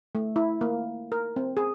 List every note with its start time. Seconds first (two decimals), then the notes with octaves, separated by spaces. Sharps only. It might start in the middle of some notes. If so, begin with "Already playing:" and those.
0.15 A3
0.36 E4
0.61 A#3
1.12 A#4
1.36 C4
1.57 G#4